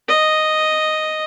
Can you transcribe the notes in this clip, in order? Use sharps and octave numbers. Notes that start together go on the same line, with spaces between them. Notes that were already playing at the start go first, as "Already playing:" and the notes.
D#5